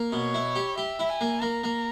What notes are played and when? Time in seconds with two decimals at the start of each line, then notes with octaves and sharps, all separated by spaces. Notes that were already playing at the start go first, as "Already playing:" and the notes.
Already playing: A#3
0.12 B2 C#5
0.34 E4
0.56 G4
0.78 G4 E5
0.99 E4
1.09 G#5
1.21 A#3
1.42 A#3 A#5
1.64 A#3